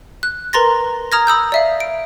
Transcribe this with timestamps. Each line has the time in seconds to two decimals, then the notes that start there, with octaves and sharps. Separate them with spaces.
0.23 F#6
0.53 A#4 B4 A#5 C6 A6 A#6
1.12 A#5 D#6 F6 G#6 A#6
1.27 B5 D#6 E6 G6
1.52 D5 E5 F5
1.80 D7